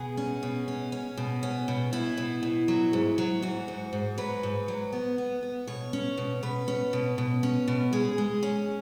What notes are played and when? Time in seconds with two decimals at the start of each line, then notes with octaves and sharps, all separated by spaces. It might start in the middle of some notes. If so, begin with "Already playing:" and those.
Already playing: B2 G#4
0.17 C#4
0.43 B2
0.68 C#4
0.92 C#4
1.17 B2
1.43 C#4
1.68 B2
1.93 B2 E4
2.18 B2
2.43 B2
2.68 F#3
2.93 G#2
3.18 F#3
3.42 G#2 F#4
3.68 G#2
3.93 G#2
4.18 F#3 B4
4.43 G#2
4.68 F#3
4.93 B3
5.18 B3
5.43 B3
5.67 B2 C#5
5.93 C#4
6.17 B2
6.43 B2 B4
6.68 C#4
6.93 B2
7.18 B2
7.43 C#4
7.68 B2
7.93 G#3 G#4
8.18 G#3
8.43 C#4